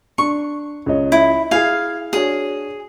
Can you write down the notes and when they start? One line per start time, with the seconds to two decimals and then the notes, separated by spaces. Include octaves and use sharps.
0.18 D4 C#6
0.86 C#2 C#5 D#5
1.12 E4
1.51 E4 G#4 F5 G#5 C7
2.13 D4 F#4 G#4 C#5